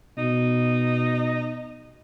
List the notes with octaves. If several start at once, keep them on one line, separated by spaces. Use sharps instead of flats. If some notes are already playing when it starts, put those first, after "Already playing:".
B2 D#4